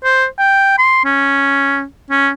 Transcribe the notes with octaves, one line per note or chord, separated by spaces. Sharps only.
C5
G5
C6
C#4
C#4